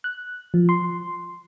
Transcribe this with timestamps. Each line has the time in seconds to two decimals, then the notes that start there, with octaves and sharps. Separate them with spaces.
0.04 F#6
0.54 F3
0.69 C6